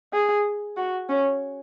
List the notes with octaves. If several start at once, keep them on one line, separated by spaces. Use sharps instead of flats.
G#4
F#4
C#4